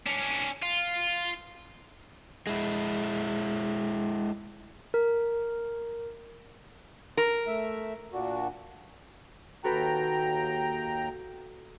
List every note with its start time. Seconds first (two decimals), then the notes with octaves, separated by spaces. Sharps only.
0.06 C#4 D4
0.63 F4
2.47 G#3 E4
4.94 A#4
7.17 A#4
7.47 A3 E5
8.13 A#2 D4 F#4
9.64 D#2 F#4 A4 B4 G5 A#5